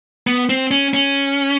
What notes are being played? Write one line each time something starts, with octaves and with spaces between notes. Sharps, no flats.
B3
C4
C#4
C#4